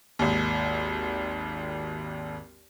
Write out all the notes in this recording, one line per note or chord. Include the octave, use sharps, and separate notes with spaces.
G#1 D#2